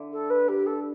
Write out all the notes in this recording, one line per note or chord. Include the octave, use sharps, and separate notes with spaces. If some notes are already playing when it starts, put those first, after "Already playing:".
Already playing: D3 E4
A4
B4
G4
A4